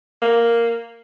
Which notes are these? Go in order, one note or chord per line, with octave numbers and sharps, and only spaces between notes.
A#3